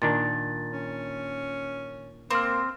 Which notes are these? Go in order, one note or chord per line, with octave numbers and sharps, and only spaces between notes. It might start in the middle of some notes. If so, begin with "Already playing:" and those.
A#2 D#3 D4 A6
C#4
A#3 C4 D6 F6